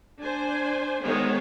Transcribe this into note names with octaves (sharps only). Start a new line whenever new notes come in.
D4 C5 G#5
D#3 G#3 B3 C5 C#5